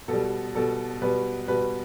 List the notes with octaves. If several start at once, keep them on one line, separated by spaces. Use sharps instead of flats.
B2 A4
G3
B2 G3 A4
B2 G3 B4
B2 G3 B4